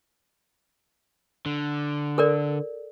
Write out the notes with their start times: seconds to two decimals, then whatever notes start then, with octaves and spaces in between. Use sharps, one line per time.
1.46 D3
2.18 A4 A#4 D5